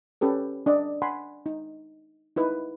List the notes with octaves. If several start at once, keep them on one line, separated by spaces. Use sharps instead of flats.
C#4 G4 A4 B4
D4 D5 D#5
F#5 G#5 B5 C6
D#4
D#4 E4 B4